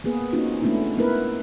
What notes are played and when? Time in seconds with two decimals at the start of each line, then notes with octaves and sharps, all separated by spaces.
0.04 A#3 B3 G#4 B4
0.33 A#3 C4 C#4 D#4 F4 F#4
0.62 G#3 A3 B3 C#4 D4 E4
0.98 A#3 B3 E4 A#4 B4